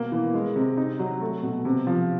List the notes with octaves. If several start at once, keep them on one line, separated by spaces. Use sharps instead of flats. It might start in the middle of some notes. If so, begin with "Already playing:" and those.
Already playing: B2 A#3
E3
G#3
C3
D#4
F#3
A3
B2
C3
F3